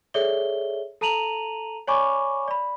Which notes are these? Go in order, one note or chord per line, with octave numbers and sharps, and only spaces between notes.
G#4 A4 C#5 D5 E5 G7
A4 A5 A#5 D#7 F7 F#7
C#5 D5 G#5 B5 C#6 D6
D5 B5